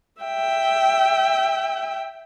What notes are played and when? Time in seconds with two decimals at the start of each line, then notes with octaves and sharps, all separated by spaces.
0.22 E5 G5